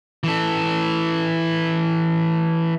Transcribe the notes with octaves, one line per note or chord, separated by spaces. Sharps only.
E3 A4